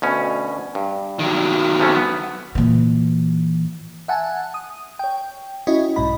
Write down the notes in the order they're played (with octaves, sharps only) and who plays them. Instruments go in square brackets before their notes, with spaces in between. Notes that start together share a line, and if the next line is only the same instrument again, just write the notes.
[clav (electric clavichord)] D2 B2 C#4
G2
[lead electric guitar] D#3 F#3
[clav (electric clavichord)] C3 A3 C#4
B3
[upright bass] A#2 E3
[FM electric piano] E5 F#5 G#5 A5
D#6
C#5 G5
C#4 E4 F#4 C#5 D#5
B1 G#2 D#5 B5